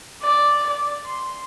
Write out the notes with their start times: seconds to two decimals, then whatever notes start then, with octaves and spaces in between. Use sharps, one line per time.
0.21 D5
0.63 D5
1.05 C6